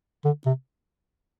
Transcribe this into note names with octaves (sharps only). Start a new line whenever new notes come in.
D3
C3